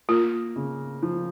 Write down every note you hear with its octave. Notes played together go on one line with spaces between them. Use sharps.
A#3 F4
C#3
F3